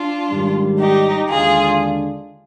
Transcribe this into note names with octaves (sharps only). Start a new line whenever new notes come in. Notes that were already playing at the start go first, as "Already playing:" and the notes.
Already playing: D4 F4
G#2 D#3 G3
D#4 G4
D#2 D3 G#3 D4 F4 G#4